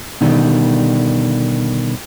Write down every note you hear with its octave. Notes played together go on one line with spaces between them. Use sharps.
B2 D3 D#3 G3